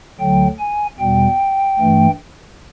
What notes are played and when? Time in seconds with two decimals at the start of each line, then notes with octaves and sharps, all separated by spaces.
0.19 D2 D3 F#3 G5
0.59 G#5
0.99 E2 B2 G3 G5
1.79 G2 E3 A3